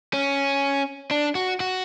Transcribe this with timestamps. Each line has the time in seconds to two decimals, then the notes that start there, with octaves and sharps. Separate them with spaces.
0.13 C#4
1.11 D4
1.35 F#4
1.60 F#4